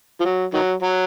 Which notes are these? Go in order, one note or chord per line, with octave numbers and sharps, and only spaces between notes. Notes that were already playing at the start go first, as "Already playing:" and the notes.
F3
F#3
D#3 F#3
F#3